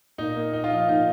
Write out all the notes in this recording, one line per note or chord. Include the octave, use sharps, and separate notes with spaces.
A#2 D#4
A#3
D#4
F4
F3 D#4
A#2 D#4